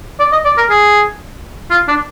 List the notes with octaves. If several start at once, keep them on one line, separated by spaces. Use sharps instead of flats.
D5
D#5
D5
A#4
G#4
F4
D4